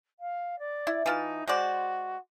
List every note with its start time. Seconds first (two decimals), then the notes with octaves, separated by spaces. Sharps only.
0.20 F5
0.59 D5
0.87 E4
1.06 E3 D#4 F4 A5
1.47 G#3 F#4 C5 D5